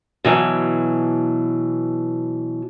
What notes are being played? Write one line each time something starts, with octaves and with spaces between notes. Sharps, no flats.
B2 E3 F#3